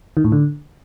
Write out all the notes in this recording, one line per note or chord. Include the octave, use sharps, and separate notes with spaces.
D#3
A2
D3